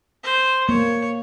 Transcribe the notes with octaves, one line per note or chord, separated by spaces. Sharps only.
C5
A#3 C#5